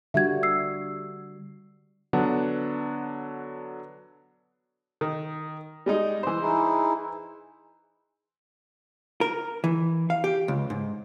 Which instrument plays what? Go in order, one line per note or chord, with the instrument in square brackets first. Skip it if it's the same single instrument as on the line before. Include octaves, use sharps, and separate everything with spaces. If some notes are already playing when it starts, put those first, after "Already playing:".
[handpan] D3 G3 F#4 [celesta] E5 G#6
[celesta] E6 C7
[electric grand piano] D3 F#3 B3 D4 F#5
[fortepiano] D#3
G3 G#3 D#4
E3 C5
[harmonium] D#4 E4 G#4
[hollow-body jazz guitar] A#4
E3
F5
G4
C#2
G#2